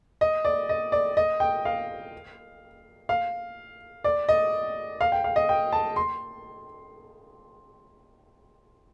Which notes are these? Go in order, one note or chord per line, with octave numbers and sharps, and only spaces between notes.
D#5
D5
D#5
D5
D#5
G5
F5
F5
D5
D#5
F5
G5
F5
D#5
G5
A5
C6